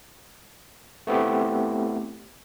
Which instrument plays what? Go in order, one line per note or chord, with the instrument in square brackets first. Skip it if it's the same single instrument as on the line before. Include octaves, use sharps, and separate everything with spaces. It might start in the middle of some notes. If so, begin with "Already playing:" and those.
[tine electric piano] A3 B3 C4 E4 G4